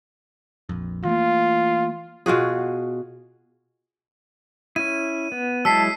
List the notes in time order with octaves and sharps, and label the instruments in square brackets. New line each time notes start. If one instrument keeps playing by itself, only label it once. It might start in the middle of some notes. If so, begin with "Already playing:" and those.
[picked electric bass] A#1 F2
[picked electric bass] E3 A3 A#3 [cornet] F4
[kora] B2 F4 F#4 G#4
[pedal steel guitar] C#4 E4 [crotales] D#7
[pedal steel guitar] B3
[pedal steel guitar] F#3 G#3 E4 [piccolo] A5 [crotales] E6 B6 C7